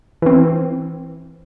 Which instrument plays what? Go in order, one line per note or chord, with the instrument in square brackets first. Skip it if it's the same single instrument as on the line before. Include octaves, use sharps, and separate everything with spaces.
[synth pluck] E3 C4